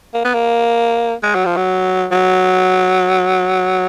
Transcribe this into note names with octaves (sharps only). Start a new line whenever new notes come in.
A#3
B3
A#3
G#3
F#3
F3
F#3
F#3